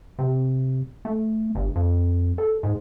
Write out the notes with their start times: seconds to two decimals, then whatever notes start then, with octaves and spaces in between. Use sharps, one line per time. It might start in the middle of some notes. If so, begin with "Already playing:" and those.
0.19 C3
1.05 A3
1.55 G1
1.76 F2
2.38 A4
2.63 G#2